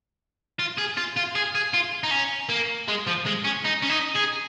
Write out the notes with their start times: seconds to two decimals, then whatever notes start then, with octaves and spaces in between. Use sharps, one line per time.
0.59 F4
0.78 G#4
0.98 F4
1.17 F4
1.35 G#4
1.55 G#4
1.74 F4
2.03 D#4
2.11 C#4
2.49 A#3
2.88 G#3
3.07 F3
3.26 G#3
3.44 C#4
3.65 D#4
3.82 C#4
3.89 D#4
4.15 G#4